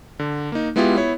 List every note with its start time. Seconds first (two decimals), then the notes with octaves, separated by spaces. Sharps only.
0.19 D3
0.52 A#3 D#4
0.76 G#3 B3 E4 F4 G4
0.97 B3 E4 C#5